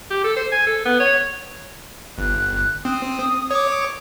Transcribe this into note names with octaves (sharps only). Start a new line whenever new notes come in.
G4
A4
C5
G#5
A4
B3
C#5
G1 F#6
C4 D#6
C#5 D6